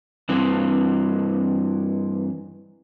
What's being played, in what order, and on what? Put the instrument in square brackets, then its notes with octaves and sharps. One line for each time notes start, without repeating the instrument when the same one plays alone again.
[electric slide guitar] G2 E3 C4